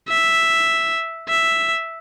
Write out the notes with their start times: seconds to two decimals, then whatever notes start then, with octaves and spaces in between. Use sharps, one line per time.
0.09 E5
1.29 E5